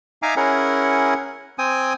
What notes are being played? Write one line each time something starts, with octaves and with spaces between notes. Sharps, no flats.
D#4 E5 F5 G#5 A#5 D6
C#4 E4 G#4 A#4 F#5
C4 G5 G#5 D#6